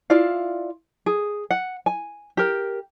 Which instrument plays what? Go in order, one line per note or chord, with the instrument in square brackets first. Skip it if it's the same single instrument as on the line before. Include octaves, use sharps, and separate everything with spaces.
[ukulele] E4 F4 D5 F5
G#4
F#5
G#5
G4 A#4